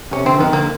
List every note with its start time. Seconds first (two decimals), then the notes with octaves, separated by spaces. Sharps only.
0.11 C3 C#4
0.25 D3 C4
0.39 D#3 B3
0.52 D3 A#3